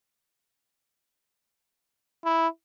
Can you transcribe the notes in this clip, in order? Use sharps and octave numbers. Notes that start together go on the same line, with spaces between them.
E4